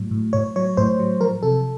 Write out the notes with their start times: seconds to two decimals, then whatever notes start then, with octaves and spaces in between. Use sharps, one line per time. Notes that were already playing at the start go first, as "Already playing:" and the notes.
Already playing: A2 F#3
0.11 A2
0.33 A2 C#5
0.56 F#3 C#5
0.77 A2 C5
0.99 F#3
1.21 F3 A#4
1.43 C3 A4